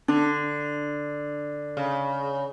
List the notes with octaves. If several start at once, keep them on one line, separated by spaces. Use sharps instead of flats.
D3 D4
C#3